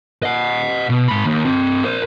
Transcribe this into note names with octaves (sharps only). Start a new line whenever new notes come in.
D#5 F#5
B2
G#2 B5
D#2
C4 D#5
A#4 C5